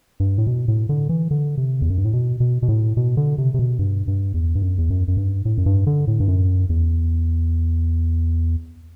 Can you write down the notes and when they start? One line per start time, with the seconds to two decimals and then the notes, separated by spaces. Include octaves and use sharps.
0.20 G2
0.38 A2
0.47 B2
0.68 A2
0.89 D3
1.09 E3
1.31 D3
1.58 C3
1.82 E2
1.90 F#2
1.98 G2
2.05 A2
2.13 B2
2.40 B2
2.62 B2
2.68 A2
2.97 B2
3.17 D3
3.38 C3
3.54 C3
3.59 B2
3.79 G2
4.08 G2
4.34 E2
4.55 G2
4.62 F#2
4.78 E2
4.90 F#2
5.08 F#2
5.17 G2
5.45 A2
5.58 F#2
5.66 G2
5.87 D3
6.08 A2
6.20 G2
6.28 F#2
6.69 E2